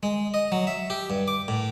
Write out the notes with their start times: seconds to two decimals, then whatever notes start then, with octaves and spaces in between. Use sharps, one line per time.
0.03 G#3
0.34 D#5
0.52 F#3
0.67 E5
0.90 G4
1.10 G2
1.28 D6
1.48 A2